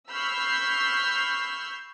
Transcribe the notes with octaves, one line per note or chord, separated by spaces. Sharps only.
B5 C#6 E6 F6 G6 C7